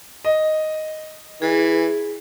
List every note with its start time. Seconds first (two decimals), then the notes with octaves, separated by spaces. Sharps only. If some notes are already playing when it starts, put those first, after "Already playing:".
0.24 D#5
1.42 E3 G#4